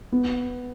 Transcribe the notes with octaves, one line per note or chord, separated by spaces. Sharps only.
B3